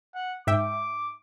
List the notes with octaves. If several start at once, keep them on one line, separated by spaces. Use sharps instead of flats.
F#5
G#2 E5 G5 D6